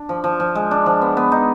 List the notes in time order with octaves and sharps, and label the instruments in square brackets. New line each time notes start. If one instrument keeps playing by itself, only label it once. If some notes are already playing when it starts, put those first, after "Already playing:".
Already playing: [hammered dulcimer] D4
F3
F3
F3
G#3
D4
F3
B3
B3
D#4